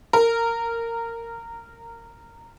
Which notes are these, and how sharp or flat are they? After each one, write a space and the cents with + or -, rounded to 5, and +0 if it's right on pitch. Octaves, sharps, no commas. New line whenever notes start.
A#4 -15